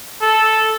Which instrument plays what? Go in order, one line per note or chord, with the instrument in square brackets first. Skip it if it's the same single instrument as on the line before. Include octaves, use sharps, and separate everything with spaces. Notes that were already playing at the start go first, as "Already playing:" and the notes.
[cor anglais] A4